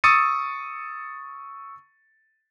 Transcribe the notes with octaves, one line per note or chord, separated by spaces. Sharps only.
C#6 D#6 E6 A6 C#7 D#7